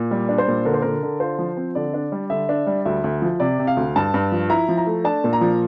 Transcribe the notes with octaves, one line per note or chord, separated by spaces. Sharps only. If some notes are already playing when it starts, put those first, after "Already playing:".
Already playing: A#2
G3
D4
C5
A#2
D3 A#4
C5
D3 A#4
D3
F4 C5
F3
C4
D3 D5
D4
G3
D3 E5
D4
G3
D2 E5
D2
F3
C3 D5
C3
F5
D2
G2 A5
G2
F3
E4 A#5
F3
A#5
A3
D4 A5
A#2
A#5
F3